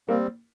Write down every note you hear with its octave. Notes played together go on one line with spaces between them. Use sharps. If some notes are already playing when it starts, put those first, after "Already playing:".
G3 A#3 C4